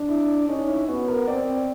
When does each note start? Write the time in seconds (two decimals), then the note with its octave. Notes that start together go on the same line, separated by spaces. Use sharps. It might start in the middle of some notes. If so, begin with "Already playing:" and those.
Already playing: D4
0.09 E4
0.48 C#4 D#4
0.69 E4
0.88 B3 F#4
1.08 A#4
1.28 C4 D5